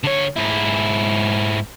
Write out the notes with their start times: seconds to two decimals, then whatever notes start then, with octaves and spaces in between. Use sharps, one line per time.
0.04 D3 C#5
0.37 G#2 E4